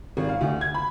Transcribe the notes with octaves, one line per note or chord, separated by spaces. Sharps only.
G#1
F5
D2
G#6
B5